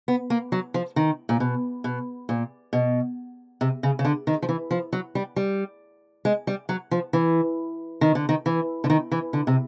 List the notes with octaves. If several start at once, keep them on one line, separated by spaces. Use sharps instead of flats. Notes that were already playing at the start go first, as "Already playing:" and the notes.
B3
A#3
F#3
F3
D#3
A#2
B2
B2
A#2
B2
C3
C#3
C#3
D3
D#3
F3
E3
F3
F#3
G3
G3
G#3
G3
F#3
F3
E3
D#3
D3
D#3
E3
D3
D#3
E3
D3
C3